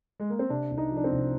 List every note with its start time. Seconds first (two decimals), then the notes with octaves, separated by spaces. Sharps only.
0.20 G#3
0.30 A#3
0.39 C4
0.49 C3 D4
0.71 C2
0.78 D#4
0.91 F3
0.97 D4
1.04 C4
1.11 C2